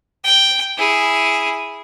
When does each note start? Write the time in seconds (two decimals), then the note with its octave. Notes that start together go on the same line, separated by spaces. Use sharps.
0.24 G5
0.78 E4 G#4